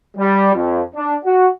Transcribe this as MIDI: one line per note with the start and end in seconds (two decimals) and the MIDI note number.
0.17 0.50 55
0.55 0.81 41
0.95 1.14 62
1.25 1.47 66